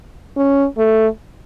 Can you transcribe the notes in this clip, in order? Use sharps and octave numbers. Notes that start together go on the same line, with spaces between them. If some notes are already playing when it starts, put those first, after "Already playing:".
C#4
A3